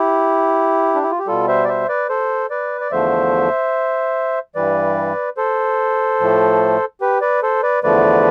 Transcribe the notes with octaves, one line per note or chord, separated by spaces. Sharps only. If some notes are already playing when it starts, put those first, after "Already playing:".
Already playing: E4 G4
D4
E4
F4
G4
B2 G3 F4 A4
C5 E5
D5
C5 E5
B4 D5
A4 C5
B4 D5
D5
E2 D3 F3 A3 C5 E5
G2 E3 G3 B4 D5
A4 C5
A2 F3 A3
G4 B4
B4 D5
A4 C5
B4 D5
E2 D3 F3 A3 B4 D5